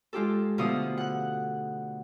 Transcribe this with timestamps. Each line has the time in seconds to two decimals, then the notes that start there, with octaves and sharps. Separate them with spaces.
0.13 G#3 F4 G4 A4
0.58 B2 D3 F3 A3 F5 D#6
0.98 F#5 F#6